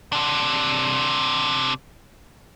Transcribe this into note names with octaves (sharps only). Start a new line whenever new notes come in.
C3 D4